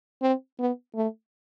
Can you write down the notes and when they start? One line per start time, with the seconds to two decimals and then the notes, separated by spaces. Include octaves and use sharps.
0.22 C4
0.59 B3
0.95 A3